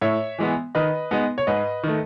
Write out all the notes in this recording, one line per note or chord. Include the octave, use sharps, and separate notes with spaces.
A2 C#5 E5
E3 G#3 B3
D#3 B4 D#5
G#3 B3 D#4
C#5
G#2 B4 D#5
D#3 A3